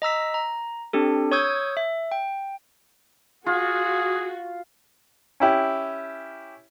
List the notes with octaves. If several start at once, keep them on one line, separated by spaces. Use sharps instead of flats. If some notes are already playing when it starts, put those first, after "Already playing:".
D#5 A#5 E6 B6
A#5
C4 D4 G4 A4
C#5 C#6 D#6 E6 G6 G#6
E5
G5
F4 F#4 G#4
C#4 E4 G4